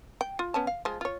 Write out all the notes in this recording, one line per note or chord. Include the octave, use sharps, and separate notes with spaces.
G5
F4
B3 C#4 A5
F5
F3 G#3
F4 C#5